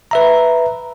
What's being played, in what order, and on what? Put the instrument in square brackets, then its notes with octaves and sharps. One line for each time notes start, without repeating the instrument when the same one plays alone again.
[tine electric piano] B4 E5 A#5